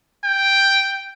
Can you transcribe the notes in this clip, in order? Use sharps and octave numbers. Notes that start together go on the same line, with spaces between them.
G5